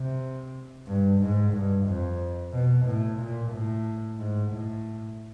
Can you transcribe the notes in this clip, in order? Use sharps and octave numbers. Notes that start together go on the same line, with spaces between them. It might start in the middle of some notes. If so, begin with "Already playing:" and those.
Already playing: C3
G2
G#2
G2
F2
B2
A2
A#2
A2
G#2
A2